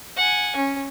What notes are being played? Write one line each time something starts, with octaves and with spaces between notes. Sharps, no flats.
F#5 G#5
C#4